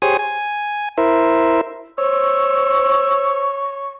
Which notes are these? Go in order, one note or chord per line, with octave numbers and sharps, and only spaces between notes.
G4 G#4 C5 C#5 G#5 D#6
G#5
E4 A#4 C5 E5
C5 C#5 C#6 E6